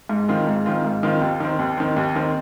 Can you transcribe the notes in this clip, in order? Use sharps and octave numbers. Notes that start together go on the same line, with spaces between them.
G#2
D#3 C4 F4
G#2
D#3 C4 F4
G#2
D#3 C4 F4
D#2
D#3 C4
D#2
D#3 C4
D#2
D#3 C4